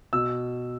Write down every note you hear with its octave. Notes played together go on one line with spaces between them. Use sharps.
B2 E6